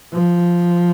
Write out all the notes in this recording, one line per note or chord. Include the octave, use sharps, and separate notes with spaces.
F3